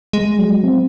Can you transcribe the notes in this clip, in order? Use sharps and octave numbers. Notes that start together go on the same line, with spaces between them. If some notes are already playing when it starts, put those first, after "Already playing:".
G#3
F#3
C4